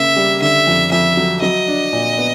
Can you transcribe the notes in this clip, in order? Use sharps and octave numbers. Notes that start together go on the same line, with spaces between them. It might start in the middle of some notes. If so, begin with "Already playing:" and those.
Already playing: C#3 A#3 E5
G3
D3 E5
F2
F2 E5
F#3
F#3 D#5
D4
A#2
B3